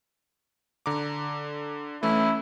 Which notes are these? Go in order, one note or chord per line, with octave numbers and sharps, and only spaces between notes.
D3 A#5 D6
E3 A3 C#4 E4